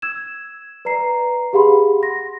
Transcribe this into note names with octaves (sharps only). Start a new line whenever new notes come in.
E6 G#6 E7
B4 D5 A#5 C7
G4 G#4 F5 F#5 B5 C6
C6 A#6